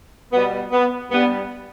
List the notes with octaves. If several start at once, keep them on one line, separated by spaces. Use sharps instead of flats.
B2 G3 B3
B3
G2 G3 B3